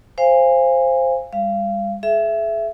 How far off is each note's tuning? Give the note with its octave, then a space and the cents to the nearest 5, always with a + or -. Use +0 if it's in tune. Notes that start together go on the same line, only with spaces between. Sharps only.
C5 +0 F5 -20 G#5 -20
G3 +45 F5 -25
G#4 +35 E5 +15